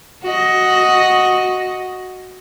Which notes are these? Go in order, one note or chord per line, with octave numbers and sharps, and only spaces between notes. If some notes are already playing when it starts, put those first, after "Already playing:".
F#4 D#5